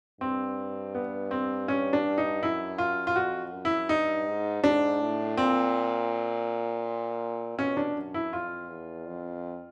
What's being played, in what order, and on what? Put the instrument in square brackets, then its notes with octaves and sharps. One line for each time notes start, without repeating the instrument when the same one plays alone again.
[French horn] G2 [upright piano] C4
[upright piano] B3
C4
C#4
D4
D#4
[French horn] F#2 [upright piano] E4
[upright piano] F4
F4
[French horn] F2 [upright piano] F#4
[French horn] F#2
[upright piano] E4
[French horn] G2 [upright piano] D#4
[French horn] G#2
[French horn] G#2 [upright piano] D4
[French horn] A2
[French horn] A#2 [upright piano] C4
[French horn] B2 [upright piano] C#4
[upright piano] D4
[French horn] F#2
[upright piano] E4
[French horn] F2 [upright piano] F4
[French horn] E2
F2